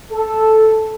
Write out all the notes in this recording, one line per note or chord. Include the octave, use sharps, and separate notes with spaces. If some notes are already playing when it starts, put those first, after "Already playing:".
A4